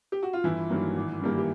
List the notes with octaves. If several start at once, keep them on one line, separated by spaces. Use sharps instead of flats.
G4
F#4
F4
G1 E3 E4
G2 D#3 F#3 A#3
G#1
G2 D#3 G3 A#3
G4